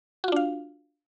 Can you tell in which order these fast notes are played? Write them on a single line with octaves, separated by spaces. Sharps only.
F#4 F4 D4 F5